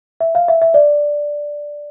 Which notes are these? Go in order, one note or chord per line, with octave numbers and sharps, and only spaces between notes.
E5
F5
E5
E5
D5